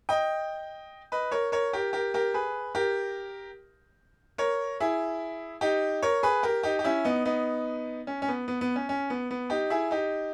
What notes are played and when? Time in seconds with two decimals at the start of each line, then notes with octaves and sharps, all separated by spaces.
0.09 D#5 G5
1.12 B4 D#5
1.32 A#4 C#5
1.52 A#4 C#5
1.73 G4 A#4
1.93 G4 A#4
2.14 G4 A#4
2.34 G#4 B4
2.75 G4 A#4
4.38 A#4 C#5
4.80 E4 G#4
5.61 D#4 G4
6.02 A#4 C#5
6.23 G#4 B4
6.43 G4 A#4
6.63 D#4 G4
6.79 G4
6.84 C#4 E4
7.04 B3 D#4
7.25 B3 D#4
8.07 C#4
8.22 C#4
8.28 B3
8.48 B3
8.61 B3
8.76 C#4
8.89 C#4
9.10 B3
9.31 B3
9.50 D#4 G4
9.70 E4 G#4
9.91 D#4 G4